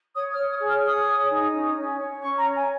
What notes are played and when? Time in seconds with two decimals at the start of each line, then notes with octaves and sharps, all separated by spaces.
0.15 C#5 D#6
0.33 F6
0.39 C#5
0.49 D#6
0.61 G#4
0.67 F6
0.83 C#5 D#6
1.06 G#4
1.30 D#4
1.53 C#4
1.75 C#4
1.98 C#5
2.21 C#4 C#6
2.38 A#5
2.44 C#5
2.55 G#5